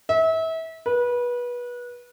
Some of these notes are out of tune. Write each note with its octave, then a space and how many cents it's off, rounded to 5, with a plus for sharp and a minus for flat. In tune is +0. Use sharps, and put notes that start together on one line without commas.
E5 -30
B4 -25